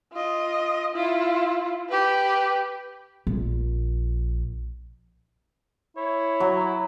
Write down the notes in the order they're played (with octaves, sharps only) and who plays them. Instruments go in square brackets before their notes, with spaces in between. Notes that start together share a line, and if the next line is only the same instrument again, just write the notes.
[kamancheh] F4 D#5
E4 F4
G4 B4
[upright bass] A#1
[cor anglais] E4 [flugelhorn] C#5
[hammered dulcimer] F#3